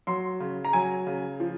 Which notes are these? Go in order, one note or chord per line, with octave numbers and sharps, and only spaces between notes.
F#3 C6
C#3
A#5
F#3 G#5
C#3
F3